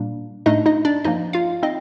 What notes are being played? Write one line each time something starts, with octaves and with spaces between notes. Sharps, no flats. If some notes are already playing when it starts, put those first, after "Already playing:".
Already playing: A#2 G3 A#3 D4
A2 A3 D4 D#4 D#5
D#4 D#5
D4 D5
G2 F3 A#3 D#4 D#5
F4 F5
C4 D#4 D#5